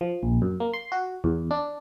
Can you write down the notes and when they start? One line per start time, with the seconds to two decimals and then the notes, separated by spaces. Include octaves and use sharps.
0.01 F3
0.23 A#1
0.42 F#2
0.60 A#3
0.74 C6
0.92 F#4
1.24 E2
1.51 D4